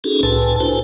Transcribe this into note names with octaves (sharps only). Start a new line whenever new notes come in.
C#4 D#4 F#4 G#4 A4
C2 A2 B4 G#5 A5
D4 E4 F#4 A4 B4 C5